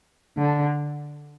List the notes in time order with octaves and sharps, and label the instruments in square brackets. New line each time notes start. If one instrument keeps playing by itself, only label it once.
[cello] D3